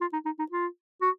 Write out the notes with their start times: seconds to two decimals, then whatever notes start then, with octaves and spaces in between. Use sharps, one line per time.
0.01 F4
0.13 D#4
0.25 D#4
0.39 D#4
0.51 F4
1.02 F#4